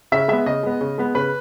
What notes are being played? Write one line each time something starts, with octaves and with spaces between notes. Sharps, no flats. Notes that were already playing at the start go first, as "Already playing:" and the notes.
C#3 E5
G#3 B3 E5
C#3 D#5
G#3 B3
C#3
G#3 B3
C#3 B4